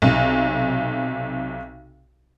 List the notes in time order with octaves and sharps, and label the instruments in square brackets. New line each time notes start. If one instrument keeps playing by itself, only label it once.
[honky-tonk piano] B1 C3